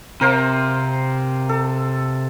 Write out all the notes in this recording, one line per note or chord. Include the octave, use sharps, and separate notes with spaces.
C3 A#4 C5 F5
A4